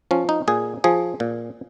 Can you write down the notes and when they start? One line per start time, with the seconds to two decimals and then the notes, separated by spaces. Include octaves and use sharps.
0.11 F3 C#4
0.29 D#4
0.48 A#2 G#4
0.84 F3 G#4
1.20 A#2